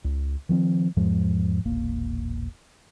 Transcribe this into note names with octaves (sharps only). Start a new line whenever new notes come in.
C#2
D#3 F3 B3 C4
E2 G#2 F3 G#3
E1 A#1 A#3